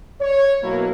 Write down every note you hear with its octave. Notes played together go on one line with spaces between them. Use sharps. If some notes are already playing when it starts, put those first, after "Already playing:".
C#5
B2 F#3 A#3 E4